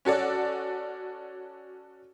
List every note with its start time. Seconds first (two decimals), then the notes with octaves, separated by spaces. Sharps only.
0.05 C#4 F#4 A4 D5